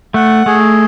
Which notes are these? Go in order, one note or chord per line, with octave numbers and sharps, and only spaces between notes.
A3 F#5
A3 G#4